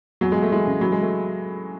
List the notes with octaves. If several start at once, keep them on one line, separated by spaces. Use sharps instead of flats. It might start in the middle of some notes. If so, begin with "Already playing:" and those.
E2 F#3
G#3
E2
A3
E3 G#3
C#3
E3 F#3
G#3
A3